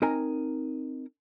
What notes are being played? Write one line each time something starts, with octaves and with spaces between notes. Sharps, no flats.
C4 D#4 A#4 G#5 A#5